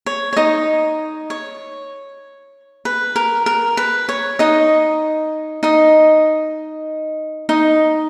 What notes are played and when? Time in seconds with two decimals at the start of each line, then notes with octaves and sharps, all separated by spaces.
0.06 C#5
0.33 C#5
0.37 D#4 D#5
1.30 C#5
2.85 B4
3.16 A#4
3.46 A#4
3.77 B4
4.09 C#5
4.39 D#4 D#5
5.63 D#4 D#5
7.49 D#4 D#5